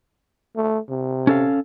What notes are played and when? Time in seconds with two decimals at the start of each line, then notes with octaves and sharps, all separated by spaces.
0.56 A3
0.90 C3
1.27 C#4 A4 F5